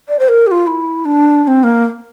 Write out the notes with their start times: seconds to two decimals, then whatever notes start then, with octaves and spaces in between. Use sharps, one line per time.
0.08 D5
0.19 C5
0.28 A#4
0.47 G4
0.51 F4
0.67 E4
1.05 D4
1.44 D4
1.47 C4
1.63 A#3